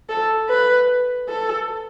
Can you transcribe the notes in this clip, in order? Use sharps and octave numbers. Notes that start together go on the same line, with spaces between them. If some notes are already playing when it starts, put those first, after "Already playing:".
A4
B4
A4